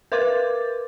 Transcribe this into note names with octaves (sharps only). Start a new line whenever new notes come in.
A#4 B4 C6 D6 A6